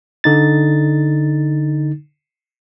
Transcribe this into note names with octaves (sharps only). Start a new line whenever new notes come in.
D3 D#4 A6